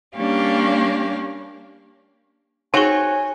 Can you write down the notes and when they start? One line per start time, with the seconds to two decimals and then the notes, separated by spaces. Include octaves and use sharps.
0.16 G3 A#3 C#4 D4 G4 F5
2.74 C4 D#4 F#4 G#4 C#5 G#5